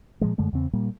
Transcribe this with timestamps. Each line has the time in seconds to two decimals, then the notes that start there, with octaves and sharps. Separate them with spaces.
0.21 A#2 F3 G#3
0.38 F#2 D3 G#3 A3
0.53 E2 C#3 C4
0.73 A#2 G3 A#3